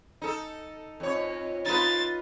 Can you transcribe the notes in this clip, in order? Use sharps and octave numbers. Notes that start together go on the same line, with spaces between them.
D#4 A4
F2 C#5
D#4 F4 B4 A6